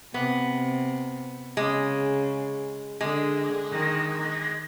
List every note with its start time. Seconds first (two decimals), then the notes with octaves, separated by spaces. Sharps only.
0.14 C3 B3
1.57 C#3 G#3
3.01 D3 G#3
3.71 D#3